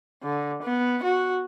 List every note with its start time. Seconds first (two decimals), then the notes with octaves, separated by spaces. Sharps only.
0.23 D3
0.62 B3
1.03 F#4